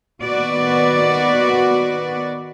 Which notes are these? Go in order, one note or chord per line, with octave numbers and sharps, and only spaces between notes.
D#3 B3 F#4 B4 D5